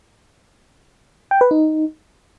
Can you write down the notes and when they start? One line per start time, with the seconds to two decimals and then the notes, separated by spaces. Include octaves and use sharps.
1.31 G5
1.41 B4
1.51 D#4